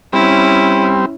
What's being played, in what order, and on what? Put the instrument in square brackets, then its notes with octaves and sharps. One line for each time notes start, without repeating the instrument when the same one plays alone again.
[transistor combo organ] G3 C4 [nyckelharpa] C#4 E4